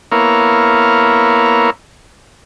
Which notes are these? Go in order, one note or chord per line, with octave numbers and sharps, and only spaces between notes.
A#3 B3 E4 A#4 C#5 F5